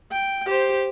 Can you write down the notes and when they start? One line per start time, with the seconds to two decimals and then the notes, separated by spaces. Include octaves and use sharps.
0.11 G5
0.46 G4 C5